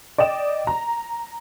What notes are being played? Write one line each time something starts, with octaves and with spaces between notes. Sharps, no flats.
D5 D#5 G5 E7
A#5